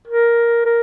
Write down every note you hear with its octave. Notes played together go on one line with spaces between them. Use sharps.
A#4
A#4